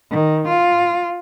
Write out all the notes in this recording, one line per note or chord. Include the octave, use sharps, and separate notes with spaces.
D#3
F4